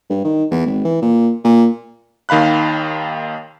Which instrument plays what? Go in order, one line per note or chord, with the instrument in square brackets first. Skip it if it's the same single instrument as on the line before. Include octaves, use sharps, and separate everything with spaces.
[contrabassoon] G2
D#3
E2
G#1
E3
A#2
A#2
[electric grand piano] D#2 D#3 F5 B5 F#6